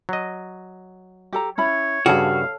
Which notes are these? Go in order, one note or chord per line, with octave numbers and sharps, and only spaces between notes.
F#3 D#5
G4 A4 A#5
C#4 E4 C#5 B5
G2 C#3 F#4 A4 C#5 F5 A5